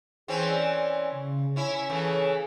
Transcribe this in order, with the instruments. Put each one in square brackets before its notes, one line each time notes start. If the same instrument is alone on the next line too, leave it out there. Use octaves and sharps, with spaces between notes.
[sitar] E3 C4 C#4 [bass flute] G#4
[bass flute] D5
C#3
[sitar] C#4 E4 [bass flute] C#5
[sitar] C#3 E3 A3